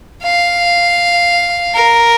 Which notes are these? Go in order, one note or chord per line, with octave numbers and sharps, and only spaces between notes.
F5
A#4